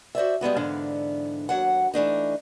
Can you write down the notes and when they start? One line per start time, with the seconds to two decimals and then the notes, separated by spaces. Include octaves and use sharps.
0.15 F#4 C5 D5 E5
0.41 G3 G#3 B3 F#4
0.56 G#2 D3 E3 B3 D4 F5
1.49 D#2 F#3 F#5
1.94 E3 A3 D4 D#4